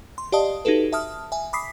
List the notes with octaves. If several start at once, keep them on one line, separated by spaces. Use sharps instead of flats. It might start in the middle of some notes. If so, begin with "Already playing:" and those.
C6
G4 D5 D#5 F5 A5 D#6
D#4 F#4 G4 A4 B4
E5 A5 D#6 F6
E5 G#5
B5 D6 D#6 B6 C7